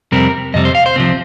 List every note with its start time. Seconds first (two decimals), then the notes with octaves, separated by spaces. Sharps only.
0.12 F2 C3 G3 C4 A#4
0.54 F2 C3 G3 C4 D#5
0.65 C5
0.75 F5
0.86 C5
0.96 C2 C3 F3 C4